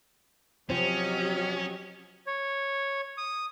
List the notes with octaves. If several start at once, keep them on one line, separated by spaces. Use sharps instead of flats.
C3 F3 F#3 C4 C#4 G4 D#5
C#5
D#6